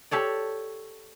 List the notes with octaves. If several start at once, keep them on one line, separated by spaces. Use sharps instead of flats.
G4 A4 C#5 D5